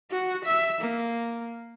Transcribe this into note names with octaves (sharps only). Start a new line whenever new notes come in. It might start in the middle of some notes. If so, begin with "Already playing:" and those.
F#4
E5
A#3